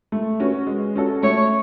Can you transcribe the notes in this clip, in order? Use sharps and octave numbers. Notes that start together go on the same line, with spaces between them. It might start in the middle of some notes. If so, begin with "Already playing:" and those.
A3
C#4 F#4 B4
G#3
C#4 F#4 A4
A3 C#5